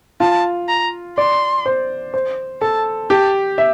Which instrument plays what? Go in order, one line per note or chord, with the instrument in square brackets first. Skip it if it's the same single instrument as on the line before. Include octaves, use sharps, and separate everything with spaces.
[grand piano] F4 [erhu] A5
[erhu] A#5
[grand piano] D5 [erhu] C6
[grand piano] C5
C5
[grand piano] A4 [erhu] A5
[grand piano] G4 [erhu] A5
[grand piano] E5